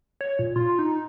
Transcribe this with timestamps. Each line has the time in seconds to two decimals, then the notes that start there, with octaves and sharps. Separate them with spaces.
0.21 C#5
0.39 A#2
0.56 F4
0.79 D#4